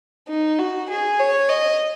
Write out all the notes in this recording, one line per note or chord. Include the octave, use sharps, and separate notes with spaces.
D#4
F#4
G#4
C#5
D#5